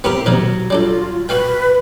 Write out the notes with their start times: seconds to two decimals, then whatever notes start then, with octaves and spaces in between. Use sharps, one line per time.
0.04 B3 C4 E4 G4 A#4
0.26 B2 D#3 F#3 A#3
0.70 G3 D4 F4 A4
1.29 F#4 B4 F5 G5